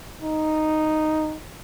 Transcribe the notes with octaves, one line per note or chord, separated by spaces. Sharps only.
D#4